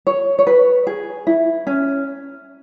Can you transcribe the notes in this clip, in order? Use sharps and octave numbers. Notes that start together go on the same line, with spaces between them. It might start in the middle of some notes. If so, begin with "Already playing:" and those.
C#5
C#5
B4
G#4
E4
C#4